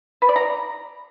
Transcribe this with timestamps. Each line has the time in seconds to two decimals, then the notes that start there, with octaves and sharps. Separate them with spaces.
0.22 B4
0.29 D5
0.36 A#5